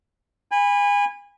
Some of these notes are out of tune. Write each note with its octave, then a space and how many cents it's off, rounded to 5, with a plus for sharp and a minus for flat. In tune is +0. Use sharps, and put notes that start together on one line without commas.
G#5 -30 B5 +0